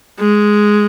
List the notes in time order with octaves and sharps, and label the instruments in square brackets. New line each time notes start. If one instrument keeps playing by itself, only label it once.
[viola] G#3